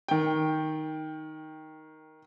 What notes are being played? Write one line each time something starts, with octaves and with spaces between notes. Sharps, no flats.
D#3 G5